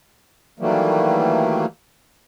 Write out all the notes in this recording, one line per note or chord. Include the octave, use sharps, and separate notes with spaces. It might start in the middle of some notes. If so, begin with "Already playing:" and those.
D#3 E3 F#3 G3 A3 A#3